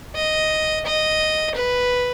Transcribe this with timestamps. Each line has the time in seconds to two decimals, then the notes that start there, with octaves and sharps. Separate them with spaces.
0.15 D#5
0.86 D#5
1.55 B4